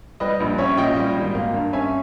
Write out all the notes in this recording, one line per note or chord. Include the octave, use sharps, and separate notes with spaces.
G3 B4 D#5
A#1
C#4 C#5 E5
A#2 D#5 G5
G3
G#1
A#3
G2
C#4 E5 G#5